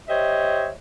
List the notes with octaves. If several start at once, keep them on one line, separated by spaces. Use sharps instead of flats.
G4 C5 C#5 D#5 E5